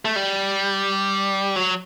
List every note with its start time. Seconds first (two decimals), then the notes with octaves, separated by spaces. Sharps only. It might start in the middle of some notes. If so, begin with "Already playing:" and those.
0.05 A3
0.16 G3
1.56 F#3